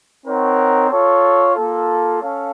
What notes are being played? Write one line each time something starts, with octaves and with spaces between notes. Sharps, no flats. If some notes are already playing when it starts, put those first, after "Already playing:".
C4 D#4 A#4 C#5 F#5
F4 A4 C#5
A#3 F4 A4
C#4 A4 C#5 F5